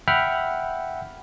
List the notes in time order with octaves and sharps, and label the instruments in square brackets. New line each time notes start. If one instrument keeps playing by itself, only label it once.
[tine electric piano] E5 F#5 G5 B5 F6